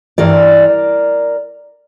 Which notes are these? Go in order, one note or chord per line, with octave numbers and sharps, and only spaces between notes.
G2 E3 A#4 D5